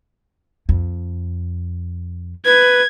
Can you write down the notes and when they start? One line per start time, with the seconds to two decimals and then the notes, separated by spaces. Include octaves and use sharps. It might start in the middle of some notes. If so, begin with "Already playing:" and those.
0.69 F2
2.45 B4 G#6